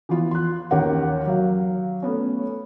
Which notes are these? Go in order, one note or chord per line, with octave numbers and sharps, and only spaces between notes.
E3 F3 B3 F4
C6 F#6
D#2 D#3 C#4 G4 A#4 F#5
F#3 F5
A3 B3 C#4